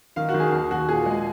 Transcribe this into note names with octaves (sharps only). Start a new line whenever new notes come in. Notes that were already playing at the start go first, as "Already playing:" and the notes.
D#3 F5
F#4
D#3
G#4
D#2
D#2 F#4
A#2 G#4
G#3